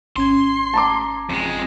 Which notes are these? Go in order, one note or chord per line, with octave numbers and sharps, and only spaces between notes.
G#1 C#4 C6 G#6
A5 A#5 D6
F2 G#3